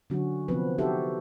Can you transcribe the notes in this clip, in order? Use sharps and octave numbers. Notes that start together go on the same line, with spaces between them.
D3 F#3 C#4 F#4
C3 F3 B3 C4 B4
D#4 F#4 G4 A4 C5 E5